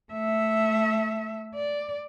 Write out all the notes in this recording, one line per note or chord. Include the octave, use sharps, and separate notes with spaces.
A3 E5
D5